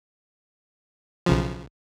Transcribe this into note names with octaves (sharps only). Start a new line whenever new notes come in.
B1 C#3 F3